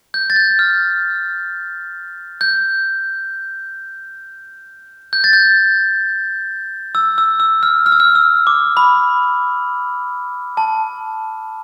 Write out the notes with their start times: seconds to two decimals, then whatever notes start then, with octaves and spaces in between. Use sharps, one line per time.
0.14 G6
0.30 A6
0.36 G6
0.59 F6
2.41 G6
5.13 G6
5.24 A6
5.33 G6
6.95 E6
7.18 E6
7.40 E6
7.63 F6
7.86 F6
7.92 E6
8.00 F6
8.15 E6
8.47 D6
8.77 B5
10.57 A5